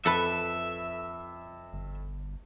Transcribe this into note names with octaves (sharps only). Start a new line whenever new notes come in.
F2 A4 B4 E5
G1